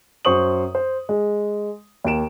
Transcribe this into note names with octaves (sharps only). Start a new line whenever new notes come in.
F#2 C5 C#6 D#6 F#7
C5
G#3
D#2 A#3 D7 E7